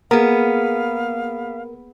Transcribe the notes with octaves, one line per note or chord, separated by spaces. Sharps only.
A#3 B3 G#4 A#4 F5